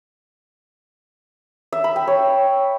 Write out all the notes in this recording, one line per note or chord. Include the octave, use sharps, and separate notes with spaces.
E5
B5
G5
C#5